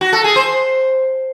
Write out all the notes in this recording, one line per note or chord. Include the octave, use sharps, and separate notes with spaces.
F#4
A4
G#4
C5